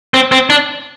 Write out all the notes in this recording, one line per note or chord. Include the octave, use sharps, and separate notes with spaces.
C4
C4
D4